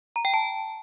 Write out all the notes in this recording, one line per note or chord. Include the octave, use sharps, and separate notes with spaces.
A#5
G5
A5